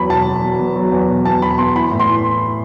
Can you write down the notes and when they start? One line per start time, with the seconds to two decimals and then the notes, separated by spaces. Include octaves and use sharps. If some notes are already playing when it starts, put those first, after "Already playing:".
Already playing: E2 F#3 B5
0.09 E1 A5
0.27 E1
0.43 B2
0.60 B2
0.76 F#3
0.92 E2
1.08 B2
1.25 E2 A5
1.42 E1 B5
1.58 E2 C6
1.75 E3 B5
1.92 A2
2.00 C6
2.09 E3